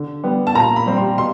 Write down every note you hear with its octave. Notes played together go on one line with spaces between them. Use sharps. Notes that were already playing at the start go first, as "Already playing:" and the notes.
Already playing: D3
G3 B3
A5
A#2 A#5
B5
G3 C4
C6
B2 C6